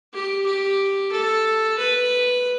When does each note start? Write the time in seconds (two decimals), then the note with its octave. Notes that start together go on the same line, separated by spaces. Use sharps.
0.13 G4
0.46 G4
1.12 A4
1.78 B4